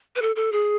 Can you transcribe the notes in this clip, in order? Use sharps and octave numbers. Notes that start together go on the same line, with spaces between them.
B4
A4
A4
G#4